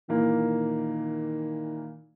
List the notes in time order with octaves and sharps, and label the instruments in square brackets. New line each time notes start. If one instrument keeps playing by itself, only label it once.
[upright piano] A#2 E3 A#3 [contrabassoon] D#3